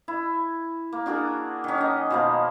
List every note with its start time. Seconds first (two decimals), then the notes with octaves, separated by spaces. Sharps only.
0.08 E4
0.92 A#3
1.06 D4 F#4 G#4 A#4
1.64 D#3 C#4
1.78 D#4 D#5
2.11 B2 F3 A#3